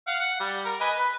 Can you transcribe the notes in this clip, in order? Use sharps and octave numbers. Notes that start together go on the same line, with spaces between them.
F5 F#5
F#5
G3
A#4
B4 D#5 G#5
B4